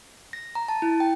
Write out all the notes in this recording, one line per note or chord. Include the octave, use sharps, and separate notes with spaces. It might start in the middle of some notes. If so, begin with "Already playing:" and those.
A#6
A#5
A5
E4
G5